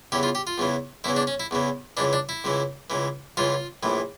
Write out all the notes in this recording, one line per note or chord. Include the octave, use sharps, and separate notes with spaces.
E2 C#3 E3 G4
F4
G4
F4
E2 C#3 E3
E2 C#3 E3 E4
D4
C#4
E4
E2 C#3 E3
C#2 C#3 E3 D4
D4
E4
C#2 C#3 E3
C#2 C#3 E3
C#2 C#3 E3 F4
A#1 A2 E3